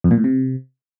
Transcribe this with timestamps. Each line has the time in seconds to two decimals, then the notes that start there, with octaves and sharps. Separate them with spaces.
0.04 F2
0.11 A#2
0.18 A2
0.24 C3